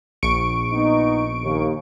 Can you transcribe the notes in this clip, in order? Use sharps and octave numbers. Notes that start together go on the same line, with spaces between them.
A#1 C#6 D7
B3 D#4
D#2